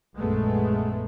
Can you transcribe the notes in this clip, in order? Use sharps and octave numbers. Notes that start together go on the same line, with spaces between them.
A#1 F#2 G#3 A3 B3